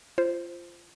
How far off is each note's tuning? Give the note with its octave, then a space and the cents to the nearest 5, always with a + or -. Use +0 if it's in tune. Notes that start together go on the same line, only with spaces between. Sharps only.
F4 -20 C5 +0